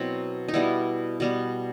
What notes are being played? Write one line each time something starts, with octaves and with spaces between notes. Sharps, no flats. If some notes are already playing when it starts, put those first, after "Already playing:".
Already playing: B2 F#3 C4 E4
D#4
B2 G3 B3 E4
B2 G3 B3